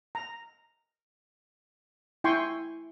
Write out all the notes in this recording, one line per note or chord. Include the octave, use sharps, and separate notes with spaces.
A#5
E4 G5 G#5 C6 C#6